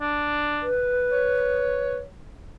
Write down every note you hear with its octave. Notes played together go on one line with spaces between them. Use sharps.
D4
B4
C#5